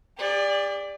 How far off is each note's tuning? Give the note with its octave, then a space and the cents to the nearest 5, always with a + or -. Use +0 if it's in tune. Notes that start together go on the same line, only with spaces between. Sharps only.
G4 +45 D5 +0